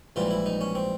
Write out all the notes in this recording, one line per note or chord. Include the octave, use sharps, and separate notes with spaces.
A#1 G#2 E3 G3 F4
E4
D#4
C#4
C4